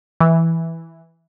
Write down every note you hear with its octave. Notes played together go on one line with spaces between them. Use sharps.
E3